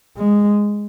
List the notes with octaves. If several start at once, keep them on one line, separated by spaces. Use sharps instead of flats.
G#3